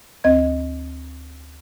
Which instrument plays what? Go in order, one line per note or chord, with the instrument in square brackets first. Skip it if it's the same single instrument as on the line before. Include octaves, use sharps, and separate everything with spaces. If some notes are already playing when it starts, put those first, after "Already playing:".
[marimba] D2 C4 D#5 G#6